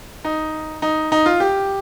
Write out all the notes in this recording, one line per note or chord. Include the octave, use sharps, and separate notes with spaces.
D#4
D#4
D#4
F4
G4